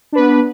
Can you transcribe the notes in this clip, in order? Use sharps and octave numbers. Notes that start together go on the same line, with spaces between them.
B3 D4 B4